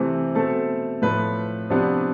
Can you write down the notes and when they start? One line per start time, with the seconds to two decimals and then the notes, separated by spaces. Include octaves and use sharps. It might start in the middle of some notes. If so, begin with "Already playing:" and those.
Already playing: C3 E3 A3 C4
0.35 B2 A3 C4 A4
1.02 A2 F3 A3 B4
1.70 C3 F3 B3 D4